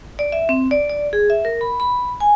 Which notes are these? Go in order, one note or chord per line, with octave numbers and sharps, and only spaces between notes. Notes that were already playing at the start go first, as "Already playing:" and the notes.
D5
E5
C4
D5
D5
G#4
E5
A#4
B5
B5
G#5